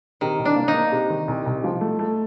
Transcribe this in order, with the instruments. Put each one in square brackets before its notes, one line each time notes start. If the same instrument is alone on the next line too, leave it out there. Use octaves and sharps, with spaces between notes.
[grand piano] C3 [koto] D#3
[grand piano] C2
[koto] D4
[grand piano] A#3
[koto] D#4
[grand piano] A#3
C3
D#3
C2
C2
F3
A3
A3